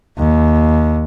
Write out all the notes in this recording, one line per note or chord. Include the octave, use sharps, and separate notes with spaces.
D#2